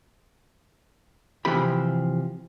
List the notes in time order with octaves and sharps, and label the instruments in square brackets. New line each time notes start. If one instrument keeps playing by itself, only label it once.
[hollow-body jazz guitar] C3 E3 F3 C4 G4 B5